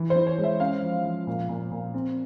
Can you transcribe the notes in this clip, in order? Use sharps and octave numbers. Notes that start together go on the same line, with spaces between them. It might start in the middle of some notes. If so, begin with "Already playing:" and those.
Already playing: E3
C5
E3
C#5
G#3
E5
C#4 F5
F3
F3
A#2
A#2
A#2
C4